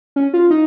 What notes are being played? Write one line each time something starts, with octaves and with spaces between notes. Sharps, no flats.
C#4
F4
D#4